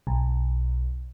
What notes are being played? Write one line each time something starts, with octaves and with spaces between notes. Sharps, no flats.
B1